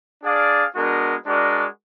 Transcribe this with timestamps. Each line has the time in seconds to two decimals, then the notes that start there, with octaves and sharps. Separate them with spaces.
0.24 D4 G#4 D5 F5
0.75 G#3 B3 D4 F#4 A#4
1.26 G#3 D4 F#4 A#4 D5